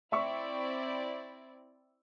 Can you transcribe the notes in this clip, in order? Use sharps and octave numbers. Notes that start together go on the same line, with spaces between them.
C4 E4 D5 E5 C#6